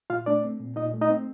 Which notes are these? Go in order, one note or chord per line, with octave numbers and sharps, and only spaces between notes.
A#2 F4 F5
A3 D4 D5
C4
A#2
A#2 D#4 D#5
A3
D#4 D#5
C4